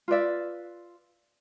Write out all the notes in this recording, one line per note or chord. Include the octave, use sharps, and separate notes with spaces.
F4 B4 D5 E5